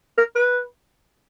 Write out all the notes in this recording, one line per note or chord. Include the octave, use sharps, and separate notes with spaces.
A#4
B4